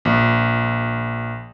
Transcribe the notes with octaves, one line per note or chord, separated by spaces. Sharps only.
A#1